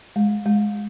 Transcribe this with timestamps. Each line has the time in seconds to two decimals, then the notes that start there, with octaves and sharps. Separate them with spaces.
0.16 G#3
0.46 G#3